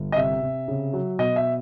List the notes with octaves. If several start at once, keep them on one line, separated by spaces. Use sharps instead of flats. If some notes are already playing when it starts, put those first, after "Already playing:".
Already playing: G1
D#5
C3 E5
C3
C#3
F#3
B2 D#5
E5